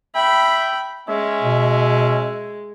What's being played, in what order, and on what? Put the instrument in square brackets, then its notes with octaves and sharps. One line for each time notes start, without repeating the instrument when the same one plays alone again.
[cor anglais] E5 [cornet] G5 [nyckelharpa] B5
[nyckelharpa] G#3 [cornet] C#4 [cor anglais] E5
[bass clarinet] B2